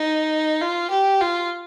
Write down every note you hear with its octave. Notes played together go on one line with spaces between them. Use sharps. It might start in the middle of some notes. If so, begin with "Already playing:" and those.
Already playing: D#4
F4
G4
F4